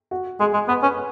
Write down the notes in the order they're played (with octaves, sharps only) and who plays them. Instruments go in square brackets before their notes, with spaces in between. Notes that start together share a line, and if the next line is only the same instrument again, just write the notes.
[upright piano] F#4
[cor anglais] G#3 [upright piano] G#4
[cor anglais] G#3
[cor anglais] B3 [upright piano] B4
[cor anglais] C#4 [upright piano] B4